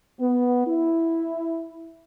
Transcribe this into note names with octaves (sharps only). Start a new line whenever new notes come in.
B3
E4